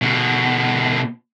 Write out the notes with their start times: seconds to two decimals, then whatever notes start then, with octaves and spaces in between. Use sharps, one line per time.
0.02 B2 D3